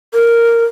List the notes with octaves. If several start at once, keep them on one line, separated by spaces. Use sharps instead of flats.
A#4